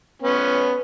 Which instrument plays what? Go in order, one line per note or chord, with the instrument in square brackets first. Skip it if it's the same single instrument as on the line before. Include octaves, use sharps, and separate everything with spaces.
[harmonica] B3 C#4